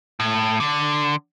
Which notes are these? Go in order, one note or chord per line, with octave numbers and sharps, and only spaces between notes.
A2
D3